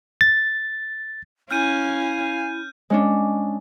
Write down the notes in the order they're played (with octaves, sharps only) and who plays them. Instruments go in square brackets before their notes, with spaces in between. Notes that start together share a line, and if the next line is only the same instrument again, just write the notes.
[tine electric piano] A6
[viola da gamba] C#4 [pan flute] E4 [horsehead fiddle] F5 G#5 [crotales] F6 G6 D#7
[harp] G#3 C#4 D4